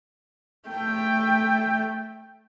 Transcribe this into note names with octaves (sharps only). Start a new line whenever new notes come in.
A3 G5